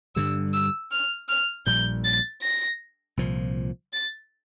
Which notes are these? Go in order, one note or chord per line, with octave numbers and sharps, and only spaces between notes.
G2 D3 G3 E6
E6
F6
F6
A#1 A#2 G3 G6
A6
A#6
C2 A#2 F3
A6